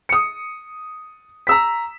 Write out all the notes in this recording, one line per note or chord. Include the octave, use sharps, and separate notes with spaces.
D#6 C#7
A#5 E6 B6